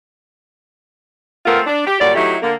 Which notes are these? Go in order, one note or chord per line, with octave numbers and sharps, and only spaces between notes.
A3 B3 C4 F4 A#4
D4
G4
A#2 F#3 G3 D5
F#3 A3 D#4 E4 G4
D3 A#3